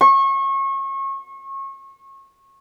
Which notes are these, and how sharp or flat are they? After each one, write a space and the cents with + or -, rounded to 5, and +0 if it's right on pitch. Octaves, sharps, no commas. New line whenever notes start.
C#6 -30